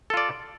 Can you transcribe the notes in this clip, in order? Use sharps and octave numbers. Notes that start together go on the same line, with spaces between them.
F4 A4 D5